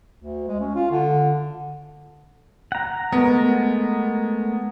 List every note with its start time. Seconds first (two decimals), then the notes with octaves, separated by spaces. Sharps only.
0.17 D2
0.48 G#3
0.60 C#4
0.76 F4
0.91 D3
2.72 F#5 A#5
3.12 G#3 A3 B3 A#4